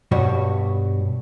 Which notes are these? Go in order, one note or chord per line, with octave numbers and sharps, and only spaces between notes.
G2 B2 G3 F#4 C#5